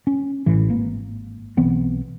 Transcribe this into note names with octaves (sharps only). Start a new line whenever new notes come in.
C#4
A1 A2 E3
G#1 A#3
B1 E3 B3 C4